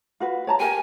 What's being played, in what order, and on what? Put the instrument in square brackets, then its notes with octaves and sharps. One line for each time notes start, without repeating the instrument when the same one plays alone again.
[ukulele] F4 F#4 B4
C#5 A5 A#5
[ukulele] G4 A#4 G5 [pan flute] G#5